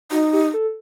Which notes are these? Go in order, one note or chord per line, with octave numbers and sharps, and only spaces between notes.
D#4 F#4
G4
A4